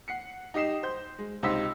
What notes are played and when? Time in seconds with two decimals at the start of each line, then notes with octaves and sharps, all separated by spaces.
0.08 F#5 C7 C#7
0.54 D#4 G4 D#5 C7 E7
0.83 C5 G6
1.19 G#3
1.43 C#2 C3 D#4 C5 E6 B6